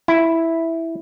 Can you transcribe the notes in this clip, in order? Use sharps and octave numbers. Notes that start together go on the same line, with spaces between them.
E4